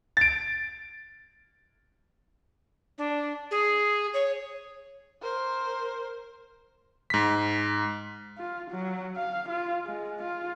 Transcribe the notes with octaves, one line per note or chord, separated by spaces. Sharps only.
A6 D7
D4
G#4
C#5
A#4 C5
G#2 B6
F4
F#3
F5
F4
G#3
F4